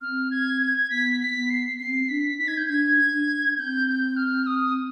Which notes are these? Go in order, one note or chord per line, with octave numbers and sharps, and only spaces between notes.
C4 F6
G#6
G#6
G#6
B3 B6
B6
B3
C7
C4 C7
D4 B6
D#4 B6
G#6
G6
D4 G#6
D4
C4 G6
G6
F6
D#6